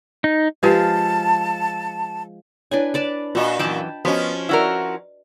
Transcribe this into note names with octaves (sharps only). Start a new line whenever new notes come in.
D#4
F3 G#3 G4 B4 F5 A5
D4 E4 B4 C#5 G#5
B4 D5 A5
A#2 F4 F#4 D#5
F#2 E3 G5 A5 B5
F3 B3 C#4 F#4 D#5
E4 F#4 A#4 B4 D5